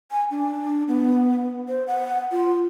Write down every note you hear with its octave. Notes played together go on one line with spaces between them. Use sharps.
G#5
D4
B3
C5
F#5
F4